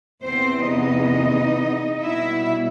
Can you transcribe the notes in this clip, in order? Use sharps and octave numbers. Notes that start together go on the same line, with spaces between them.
E2 C3 E3 B3 C4 C5
D#4 D#5
B2 G3 B3 E4 E5